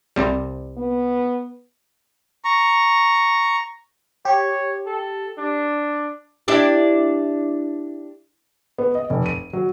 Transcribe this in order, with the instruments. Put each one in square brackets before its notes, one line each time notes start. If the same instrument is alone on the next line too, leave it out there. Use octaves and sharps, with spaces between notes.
[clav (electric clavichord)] C2 C3 G3
[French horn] B3
[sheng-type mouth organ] A#5 C#6
[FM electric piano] G4 [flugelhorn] C#5
[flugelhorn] A4
D4
[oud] D4 E4 G4
[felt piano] B3
D#5
F1
D#7
F#3